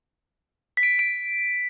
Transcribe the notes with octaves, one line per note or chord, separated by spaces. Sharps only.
B6
D7
D7